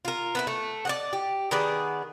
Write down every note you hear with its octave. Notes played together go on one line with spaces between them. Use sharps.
F4 A#4
B3 D#4 E4
A3
D5 D#5 F#5
G4
D#3 B3 G#4 D5